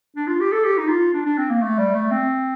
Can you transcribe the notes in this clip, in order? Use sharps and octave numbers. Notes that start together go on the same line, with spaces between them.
D4
F4
G4
A4
G4
D#4
F4
D4
D4
C4
A#3
A3
G3
A3
C4